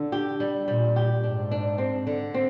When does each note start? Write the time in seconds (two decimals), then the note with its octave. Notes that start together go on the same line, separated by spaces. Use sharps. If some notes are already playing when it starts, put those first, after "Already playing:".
Already playing: D3
0.12 G4
0.40 G3
0.68 A#2 G3
0.96 G4
1.23 G#2 D4
1.51 D4
1.78 C4
2.07 D3
2.34 C4